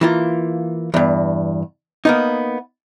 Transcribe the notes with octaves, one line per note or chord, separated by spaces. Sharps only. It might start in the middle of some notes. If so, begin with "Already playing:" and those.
E3 A#3 F4
E2 G2
A#3 B3 D#4